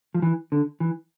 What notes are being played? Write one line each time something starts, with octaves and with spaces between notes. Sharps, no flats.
F3
E3
D3
E3